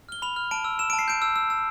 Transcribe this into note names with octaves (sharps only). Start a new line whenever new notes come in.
F6 G7
B5 F7
F6
A5 D7
E6
E6 E7
A5 D7
C7
G6 D7
E6
E6
E6